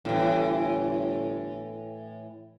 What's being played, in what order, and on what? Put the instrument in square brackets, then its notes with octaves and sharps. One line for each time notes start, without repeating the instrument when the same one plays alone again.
[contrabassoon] G1 [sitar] A2 E3